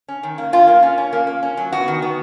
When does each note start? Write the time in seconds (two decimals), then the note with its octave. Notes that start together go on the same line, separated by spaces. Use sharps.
0.08 C#4
0.23 D#3
0.38 A#3
0.52 C#4 F4
0.67 A#3
0.83 C#4
0.98 C#4
1.13 A#3
1.27 A#3
1.43 C#4
1.57 F#3
1.72 B3 F#4
1.88 D#3
2.02 B3